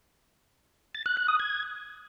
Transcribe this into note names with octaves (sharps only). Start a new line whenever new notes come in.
A6
F#6
F#6
D#6
G#6